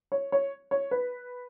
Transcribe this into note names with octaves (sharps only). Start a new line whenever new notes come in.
C#5
C#5
C#5
B4